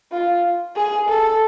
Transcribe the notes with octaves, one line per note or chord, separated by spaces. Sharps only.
F4
G#4
A4